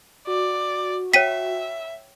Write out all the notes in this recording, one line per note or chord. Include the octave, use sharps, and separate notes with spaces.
F#4 D5
C#5 E5 F#5 G5 B6 D#7